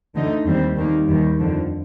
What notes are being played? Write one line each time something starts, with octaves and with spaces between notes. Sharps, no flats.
D2 D3 A3 D#4
D#2 D#3 G3 C4
D#2 D#3 G3 A#3
D#2 D#3 G3
F2 D3 F3